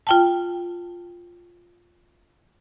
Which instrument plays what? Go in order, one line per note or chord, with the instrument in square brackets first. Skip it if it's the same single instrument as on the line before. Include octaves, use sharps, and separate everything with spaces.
[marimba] F4 G5 A5